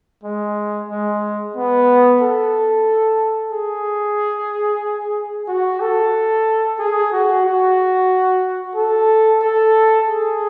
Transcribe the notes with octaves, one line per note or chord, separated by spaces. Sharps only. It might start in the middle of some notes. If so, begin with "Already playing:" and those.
G#3
G#3
B3
A4
G#4
F#4
A4
G#4
F#4
F#4
A4
A4
G#4